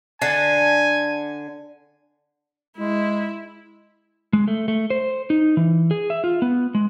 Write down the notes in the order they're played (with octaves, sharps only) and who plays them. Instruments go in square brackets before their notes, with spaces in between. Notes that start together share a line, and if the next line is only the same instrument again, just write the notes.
[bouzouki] D3 D4 A5 [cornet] G#5
[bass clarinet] G#3 [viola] E4
[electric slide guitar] G#3
A3
A3
C5
D#4
E3
G#4
E5
F4
B3
G#3